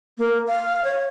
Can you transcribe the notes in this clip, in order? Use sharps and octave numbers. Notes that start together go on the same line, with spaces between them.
A#3
F5
C#5